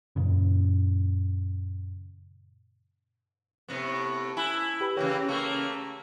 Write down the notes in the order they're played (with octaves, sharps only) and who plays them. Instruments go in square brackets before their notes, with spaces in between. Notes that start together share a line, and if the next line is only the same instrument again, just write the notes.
[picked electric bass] F#2 A#2 C#3
[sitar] A2 C3 B3
[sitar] E4 [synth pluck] G#5 B5 F#6
[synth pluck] G4 B4 B5
[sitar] C#3 E3 A#3 [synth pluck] G4 C#5 G5
[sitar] C#3 A3 A#3 [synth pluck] C#6 E6